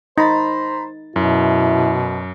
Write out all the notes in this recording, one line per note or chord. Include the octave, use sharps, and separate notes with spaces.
D#4 C5 A#5 B5 A6
F#2 B2 E4